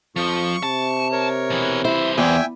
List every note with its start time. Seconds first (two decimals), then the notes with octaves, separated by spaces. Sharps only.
0.16 F2 F3 C#6
0.63 C3 A5
1.12 A#4 C#5
1.50 B2 E3
1.85 E3 E4 C5
2.18 E2 E5 G5 G#5